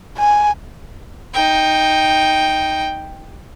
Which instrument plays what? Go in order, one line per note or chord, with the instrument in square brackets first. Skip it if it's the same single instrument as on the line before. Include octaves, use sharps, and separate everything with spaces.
[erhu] G#5
[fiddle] D#4 G5